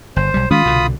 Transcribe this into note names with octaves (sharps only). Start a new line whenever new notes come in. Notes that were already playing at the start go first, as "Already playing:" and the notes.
G1 C5
B1 G3
D#3 G#3 C#4 F4 B5 D#6
C2 B2 D3